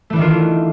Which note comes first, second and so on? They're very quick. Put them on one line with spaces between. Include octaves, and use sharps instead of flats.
A3 E3 D4 D#3 F4